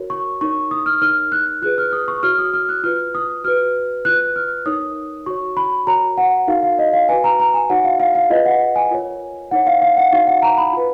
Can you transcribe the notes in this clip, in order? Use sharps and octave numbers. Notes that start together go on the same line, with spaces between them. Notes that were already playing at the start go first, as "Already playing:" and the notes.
Already playing: F#4 A#4 C#5
C#6
D#4 A#4 C#5 C#6
D#6
F6
D#4 A#4 C#5 F6
F#6
F4 G#4 B4 F#6
F6
D#6
C#6
F#4 C#5 F6
D#6
F6
F#6
F4 B4 F6
D#6
F#4 B4 F6
F4 B4 F#6
F6
D#4 A#4 C#5 D#6
F#4 C#5 C#6
B5
F#4 A#4 C#5 A#5
F#5
D#4 F#4 A#4 F5
F5
D#5
F5
F#4 B4 G#5
A#5
A#5
G#5
D#4 F#4 C#5 F#5
F5
F5
F5
F4 G#4 B4 D#5
F#5
G#5
F4 A#4 C#5
D#4 A#4 C#5 F#5
F5
F5
F#5
D#4 F#4 C#5 F5
F#5
A#5
B5
F4 B4